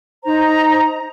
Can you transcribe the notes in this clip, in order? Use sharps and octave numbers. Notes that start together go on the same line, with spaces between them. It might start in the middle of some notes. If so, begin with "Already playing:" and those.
D#4 C5 A#5